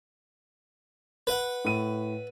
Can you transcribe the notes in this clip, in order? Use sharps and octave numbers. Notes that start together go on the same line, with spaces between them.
B4 F#5
A2 D#7